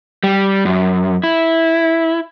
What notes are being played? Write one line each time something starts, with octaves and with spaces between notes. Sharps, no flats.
G3
F#2
E4